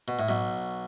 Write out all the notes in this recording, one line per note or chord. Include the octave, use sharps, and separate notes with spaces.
B2
A2
B1 B2